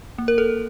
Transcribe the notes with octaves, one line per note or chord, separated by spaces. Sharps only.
A#3
A#4
A4